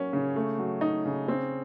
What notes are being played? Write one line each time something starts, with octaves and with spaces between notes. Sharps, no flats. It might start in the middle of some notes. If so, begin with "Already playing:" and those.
Already playing: F#3 A#3 C#4
C#3
A3
F#3
D#4
C#3
C4